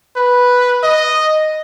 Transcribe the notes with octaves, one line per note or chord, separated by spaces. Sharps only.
B4
D#5